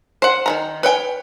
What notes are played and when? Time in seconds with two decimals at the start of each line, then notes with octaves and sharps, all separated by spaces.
0.22 C5 F#5
0.46 D#3 F3 A#5
0.83 B4 C#5 G5 G#5